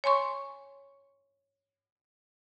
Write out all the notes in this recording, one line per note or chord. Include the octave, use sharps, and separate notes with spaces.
C#5 G#5 C6 C#6